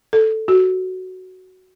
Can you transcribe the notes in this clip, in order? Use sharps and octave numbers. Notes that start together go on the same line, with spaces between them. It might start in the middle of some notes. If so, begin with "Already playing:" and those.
A4
F#4